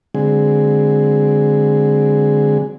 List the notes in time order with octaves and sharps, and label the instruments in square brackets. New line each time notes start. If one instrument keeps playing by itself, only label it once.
[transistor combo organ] D3 F#3 G#3 C4 G#4